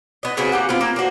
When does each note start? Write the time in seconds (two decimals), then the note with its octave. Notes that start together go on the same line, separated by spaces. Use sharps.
0.23 B3 D#5
0.37 C#3 B3 C4 F#4
0.52 A#3 G4 F#5
0.69 B3 C4 F4
0.81 A#3
0.96 A#3 D4 F#4 C5